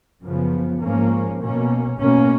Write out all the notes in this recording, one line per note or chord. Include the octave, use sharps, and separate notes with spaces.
F#2 C#3 F3 B3
G#2 F3 A#3 C#4
B2 A#3 C#4
B2 A#3 C#4